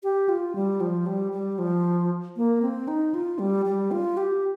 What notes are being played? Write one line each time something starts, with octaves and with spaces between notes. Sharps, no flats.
G4
F4
G3
F3
G3
G3
F3
A#3
C4
D#4
F4
G3
G3
F4
G4